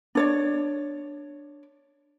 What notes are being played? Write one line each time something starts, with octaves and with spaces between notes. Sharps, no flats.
D4 C#5 D5